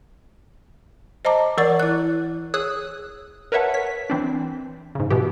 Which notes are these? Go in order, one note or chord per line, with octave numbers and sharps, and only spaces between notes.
C5 D#5 A5 A#5 D6
E3 A#4 D5 F#5 C#6 A6
E4 F#6
G#4 C#5 D#6 E6 F#6
A#4 B4 C#5 E5 F#5 A5
C#5 B6
E3 C4 D4
G#2 C#3
B2 E3 G4